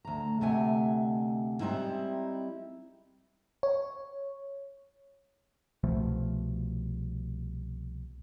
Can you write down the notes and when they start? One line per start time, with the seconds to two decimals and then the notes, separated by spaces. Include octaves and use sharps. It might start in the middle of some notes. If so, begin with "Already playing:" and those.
0.05 D2 A#5
0.41 D2 C3 G#3 A3 F#5 G#5
1.60 G3 G#3 C4 D#4 E4
3.63 C#5
5.84 C2 B2 F3 A3